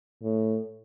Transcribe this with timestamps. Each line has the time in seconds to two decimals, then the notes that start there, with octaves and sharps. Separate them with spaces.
0.23 A2